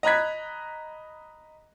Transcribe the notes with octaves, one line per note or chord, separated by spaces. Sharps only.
D#5 A#5 B5 F#6 G#6 B6